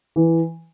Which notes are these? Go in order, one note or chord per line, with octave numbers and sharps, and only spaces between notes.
E3